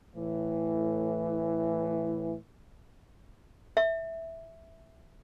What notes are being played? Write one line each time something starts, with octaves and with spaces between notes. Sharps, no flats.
A2 E3
E5